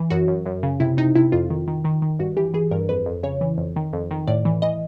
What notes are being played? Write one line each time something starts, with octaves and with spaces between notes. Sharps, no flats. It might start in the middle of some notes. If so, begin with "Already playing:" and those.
Already playing: E3
F#2 F#4
F#2
F#2
C#3
C3 E4
C3 D#4
C3 E4
F2 F4
D#3
D#3
D#3
D#3
G2 F#4
E3 G4
E3 G#4
G2 A#4
F2 B4
F2
C#3 C#5
E3
F2
D#3
F2
D#3
A2 D5
E3
E3 D#5